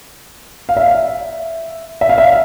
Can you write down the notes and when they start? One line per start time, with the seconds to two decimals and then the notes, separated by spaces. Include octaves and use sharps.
0.69 F5
0.77 E5
2.01 E5
2.09 F5
2.18 E5